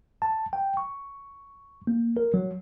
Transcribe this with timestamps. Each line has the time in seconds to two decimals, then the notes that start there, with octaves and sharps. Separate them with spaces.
0.22 A5
0.53 G5
0.77 C#6
1.87 A#3
2.17 A#4
2.34 F#3